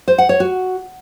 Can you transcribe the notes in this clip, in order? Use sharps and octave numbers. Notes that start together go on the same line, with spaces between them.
C5
F#5
C#5
F#4